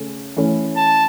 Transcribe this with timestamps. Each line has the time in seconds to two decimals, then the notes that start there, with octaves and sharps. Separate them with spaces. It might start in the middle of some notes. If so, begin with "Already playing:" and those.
Already playing: C#3 A3 C#4
0.36 E3 A3 C#4
0.76 A5